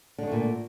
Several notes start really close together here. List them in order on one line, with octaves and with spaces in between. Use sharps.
D3 G#3 A3 A#2